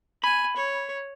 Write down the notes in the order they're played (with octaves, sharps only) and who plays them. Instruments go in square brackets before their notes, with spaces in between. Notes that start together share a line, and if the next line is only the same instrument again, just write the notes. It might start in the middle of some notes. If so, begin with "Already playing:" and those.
[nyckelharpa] G#5 [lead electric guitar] B5
[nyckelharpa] C#5